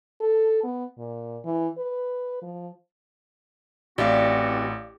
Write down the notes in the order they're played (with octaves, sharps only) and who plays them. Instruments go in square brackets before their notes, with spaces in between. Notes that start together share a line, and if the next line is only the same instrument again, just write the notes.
[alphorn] A4
B3
A#2
E3
B4
F3
[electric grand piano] A1 [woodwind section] E3 C4 F#4 [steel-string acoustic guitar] G4 [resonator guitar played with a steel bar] D5 E5 F5